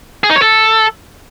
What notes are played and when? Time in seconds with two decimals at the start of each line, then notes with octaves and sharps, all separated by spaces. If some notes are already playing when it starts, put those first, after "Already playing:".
0.24 G#4
0.30 D#4
0.36 C#5
0.42 A4